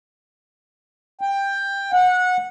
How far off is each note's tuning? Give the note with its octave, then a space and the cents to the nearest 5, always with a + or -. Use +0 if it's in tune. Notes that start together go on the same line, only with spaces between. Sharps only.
G5 +15
F#5 -20